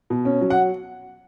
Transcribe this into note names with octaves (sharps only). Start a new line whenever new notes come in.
B2
C#4
F#3
F#5